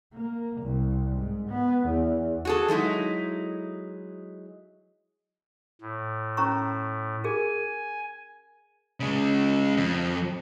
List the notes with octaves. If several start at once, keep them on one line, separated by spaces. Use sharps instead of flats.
A#3
C2
G#2
B3
E2
F#4 G#4 A4
F#3 G#3 D#4 E4
A2
C#4 A#5 C#6
G#4 A#4 G#5
C#3 G#3
F2